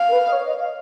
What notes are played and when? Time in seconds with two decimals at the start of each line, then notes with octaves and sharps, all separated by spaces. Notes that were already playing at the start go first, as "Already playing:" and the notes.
Already playing: F5
0.08 A#4
0.13 B4
0.27 D#5
0.33 C#5
0.46 D#5
0.59 F5